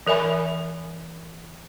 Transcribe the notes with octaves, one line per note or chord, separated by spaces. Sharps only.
E3 A#4 E5 G#5 B5